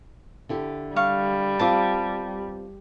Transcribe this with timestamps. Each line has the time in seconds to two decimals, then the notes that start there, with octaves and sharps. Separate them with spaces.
0.49 D3 E4 G4
0.96 G3 F5 C#6
1.59 B3 C4 F4 A5 D6